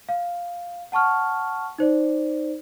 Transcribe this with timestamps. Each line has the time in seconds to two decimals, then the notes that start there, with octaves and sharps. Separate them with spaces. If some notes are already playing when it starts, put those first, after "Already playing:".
0.09 F5
0.92 F#5 A5 C#6 F6
1.78 D#4 C5 D5